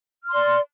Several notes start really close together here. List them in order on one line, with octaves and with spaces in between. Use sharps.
F6 C6 D5